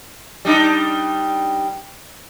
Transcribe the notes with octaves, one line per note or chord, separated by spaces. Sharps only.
G3 D4 D#4